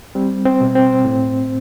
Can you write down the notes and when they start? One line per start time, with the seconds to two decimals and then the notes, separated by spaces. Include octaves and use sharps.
0.15 G3 C4
0.45 C4
0.61 B2
0.75 C4
1.05 A2